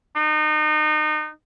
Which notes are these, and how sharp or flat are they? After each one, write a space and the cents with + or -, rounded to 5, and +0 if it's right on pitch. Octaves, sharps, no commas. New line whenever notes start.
D#4 -30